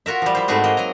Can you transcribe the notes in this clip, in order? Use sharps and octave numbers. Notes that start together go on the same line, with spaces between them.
F4 F#4 A#4 E5
F3 G3
E4 C5
G#2 A3 C4 F#4 G#4
A#3 D#5
F#3 G#5 A#5